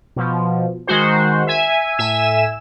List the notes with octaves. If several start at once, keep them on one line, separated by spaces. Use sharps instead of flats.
B2 F3
D#3 G#3 F#4 C5
E5 G#5
A2 E5 G#5 E6 E7